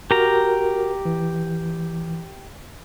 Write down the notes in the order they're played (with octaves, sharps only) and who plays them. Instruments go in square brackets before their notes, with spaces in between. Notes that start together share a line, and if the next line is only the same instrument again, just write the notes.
[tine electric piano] F#4 A#4 [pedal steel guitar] G4 A#5
[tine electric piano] E3